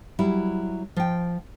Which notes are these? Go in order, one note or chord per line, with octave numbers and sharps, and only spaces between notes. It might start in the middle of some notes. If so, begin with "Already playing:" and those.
F#3 G3 E4
F3 G5